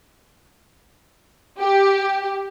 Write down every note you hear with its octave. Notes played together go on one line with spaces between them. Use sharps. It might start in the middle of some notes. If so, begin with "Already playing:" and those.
G4